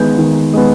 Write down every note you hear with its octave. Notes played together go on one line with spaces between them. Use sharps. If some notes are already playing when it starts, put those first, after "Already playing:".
Already playing: D#3 G#3 B3 G6
D#3
G#3 B3